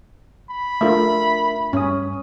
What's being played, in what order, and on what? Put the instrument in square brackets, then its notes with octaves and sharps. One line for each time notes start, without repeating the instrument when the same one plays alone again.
[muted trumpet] B5
[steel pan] A3 F4 [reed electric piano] D4 A#4 E5
[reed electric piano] G2 D#6 [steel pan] C#4